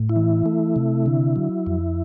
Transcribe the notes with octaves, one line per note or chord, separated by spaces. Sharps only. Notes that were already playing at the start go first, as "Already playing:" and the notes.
Already playing: A2
E4
E3
A3
C3
D3
F#3
F2